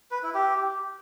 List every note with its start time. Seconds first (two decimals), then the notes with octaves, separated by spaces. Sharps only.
0.11 B4
0.23 E4
0.34 G4